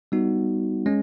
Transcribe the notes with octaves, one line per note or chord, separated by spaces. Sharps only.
G3 B3 D#4 F#4
G#3 C#4